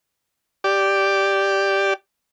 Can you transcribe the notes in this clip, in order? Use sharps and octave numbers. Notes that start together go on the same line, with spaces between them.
G4 D5